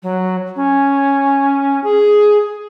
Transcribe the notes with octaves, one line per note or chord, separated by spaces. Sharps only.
F#3
C#4
G#4